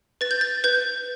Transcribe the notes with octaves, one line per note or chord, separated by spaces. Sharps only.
B4 A6
G6
A6
B4 G6